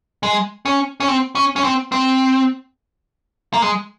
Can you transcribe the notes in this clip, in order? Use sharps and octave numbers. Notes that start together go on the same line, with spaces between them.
G#3
C#4
C#4
C4
C#4
C#4
C4
C4
A#3
G#3